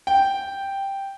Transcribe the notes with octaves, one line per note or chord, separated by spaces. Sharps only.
G5